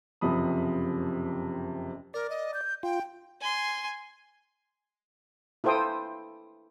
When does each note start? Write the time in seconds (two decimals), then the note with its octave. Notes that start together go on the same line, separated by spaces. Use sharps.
0.21 F#1 F2 C3 F3 B5 D#6
2.14 A#4 D5
2.30 D#5
2.54 G6
2.83 F4 G5
3.40 G#5 C6
5.64 E4 F4 A4 C5 G5 D#6